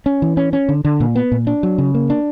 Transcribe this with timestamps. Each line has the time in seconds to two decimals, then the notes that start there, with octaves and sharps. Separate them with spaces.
0.06 C#4
0.22 E3
0.37 C#4
0.53 C#4
0.69 D3
0.85 D3
1.00 A#2
1.15 B3
1.32 A#2
1.47 D4
1.63 F#3
1.78 C#3
1.95 A#3
2.10 D4